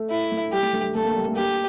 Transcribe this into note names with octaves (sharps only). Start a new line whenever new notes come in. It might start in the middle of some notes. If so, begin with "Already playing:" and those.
Already playing: A3
E4
A3
G3 G4
A3
A3
G3
A3 A4
A#3
G3
A3
A#3 G4